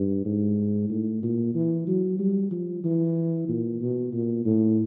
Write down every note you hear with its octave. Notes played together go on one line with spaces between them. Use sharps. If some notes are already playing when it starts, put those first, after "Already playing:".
Already playing: G2
G#2
A2
A#2
E3
F#3
G3
F3
E3
A#2
B2
A#2
A2